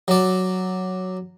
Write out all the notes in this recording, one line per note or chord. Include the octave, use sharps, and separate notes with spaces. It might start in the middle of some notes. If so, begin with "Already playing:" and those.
F#3 D5